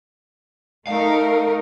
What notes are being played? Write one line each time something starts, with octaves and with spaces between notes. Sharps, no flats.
A3 D#4 A#4 F5